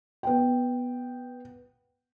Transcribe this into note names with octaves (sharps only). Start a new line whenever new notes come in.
B3 G5